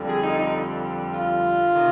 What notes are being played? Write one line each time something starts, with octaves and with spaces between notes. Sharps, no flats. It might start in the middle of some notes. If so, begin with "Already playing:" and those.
Already playing: F2 D3 G3
G#4
D#4
D#4
F4
C3 D#3